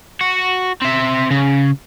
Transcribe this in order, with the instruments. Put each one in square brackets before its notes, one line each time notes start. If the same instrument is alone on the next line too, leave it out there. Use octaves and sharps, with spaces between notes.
[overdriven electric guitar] F#4
C4 E5
C#3